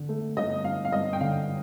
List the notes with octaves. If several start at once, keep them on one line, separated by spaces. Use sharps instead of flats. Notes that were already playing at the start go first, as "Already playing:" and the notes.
Already playing: D3
A3
G1 D#5
G1 F5
F5
G2 D#5
G5
D3 F5